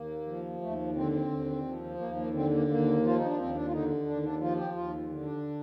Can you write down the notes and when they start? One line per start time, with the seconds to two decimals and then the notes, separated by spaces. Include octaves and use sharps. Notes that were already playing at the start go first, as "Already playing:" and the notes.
Already playing: D#2 A#3
0.27 F3
0.61 D#2 A3
0.96 D3 C4
1.13 C4
1.30 D#2
1.65 F3
1.99 D#2 A#3
2.17 A#3
2.33 D3 C4
2.51 A#3
2.68 D#2 A#3
3.03 F3 F4
3.16 D#4
3.26 D4
3.37 D#2 C4
3.54 D4
3.67 F4
3.71 D3 D#4
4.06 D#2 D4
4.23 D4
4.40 F3 F4
4.58 G4
4.75 D#2 F4
5.10 D3
5.22 D4